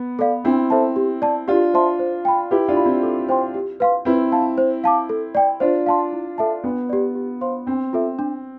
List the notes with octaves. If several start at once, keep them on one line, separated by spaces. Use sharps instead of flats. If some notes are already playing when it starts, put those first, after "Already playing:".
Already playing: B3
A4 D5 F5
C4 D4 E4
A4 C5 E5 A5
G4
D5 A5
D4 F4 G4
C5 E5 A5 C6
C5
G5 B5
E4 G4 B4
D4 F4
F5 B5
C4 E4
A4
C5 G5 C6
G4
B4 F5 C6
C4 E4 B4
F5 A5
C5
F5 A5 D6
A4
D5 G5
D4 F4 C5
F5 A5 C6
E4
A4 E5 A5
B3 D4
G4 D5
G4
C5 F5 C6
C4 D4
F4 A4 E5
D4